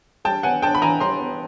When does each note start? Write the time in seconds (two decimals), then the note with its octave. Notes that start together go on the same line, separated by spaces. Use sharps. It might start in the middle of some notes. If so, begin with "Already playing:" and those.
0.25 G3 G5 A5
0.43 B3 F#5 G#5
0.62 D4 G5 A5
0.75 B5
0.81 E3 G#5 A#5
1.00 G3 A#5 C6
1.20 B3